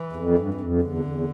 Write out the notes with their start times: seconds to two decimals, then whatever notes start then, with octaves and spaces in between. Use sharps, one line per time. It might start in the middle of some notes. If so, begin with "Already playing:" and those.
Already playing: E3
0.13 E2
0.16 F2
0.38 G2
0.54 G2
0.61 F2
0.83 E2 D3
1.05 E2